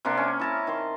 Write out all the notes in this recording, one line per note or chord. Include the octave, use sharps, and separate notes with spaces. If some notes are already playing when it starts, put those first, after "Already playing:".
C3 A#3 D4
C#4
E4 A5 A#5
D#3 C6